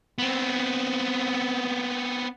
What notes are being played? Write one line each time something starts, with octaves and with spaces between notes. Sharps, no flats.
B3 C4